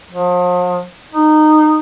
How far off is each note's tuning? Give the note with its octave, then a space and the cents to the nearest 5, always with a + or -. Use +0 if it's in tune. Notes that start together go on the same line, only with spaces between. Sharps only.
F3 +40
D#4 -20